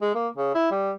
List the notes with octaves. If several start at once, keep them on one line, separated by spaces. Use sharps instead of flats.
G#3
A#3
C#3
E4
G3